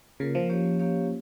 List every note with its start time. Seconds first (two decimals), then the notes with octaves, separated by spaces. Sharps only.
0.20 C#3 A#3 F4 A#4
0.35 F3
0.49 A#3 C#4 G4 C#5 F5
0.79 A#3 C#4 G4 C#5 F5